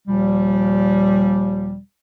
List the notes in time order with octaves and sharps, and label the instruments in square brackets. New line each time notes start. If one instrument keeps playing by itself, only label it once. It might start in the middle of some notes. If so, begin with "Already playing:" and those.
[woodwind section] D#2 A#2 F3 G3